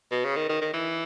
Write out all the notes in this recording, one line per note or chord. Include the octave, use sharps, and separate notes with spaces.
B2
C#3
D#3
D#3
D#3
E3